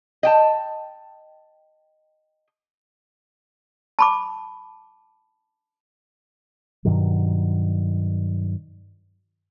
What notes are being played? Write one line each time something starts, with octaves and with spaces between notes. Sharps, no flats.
D#5 G5 A5
A5 B5 D6
G2 B2 D#3 F#3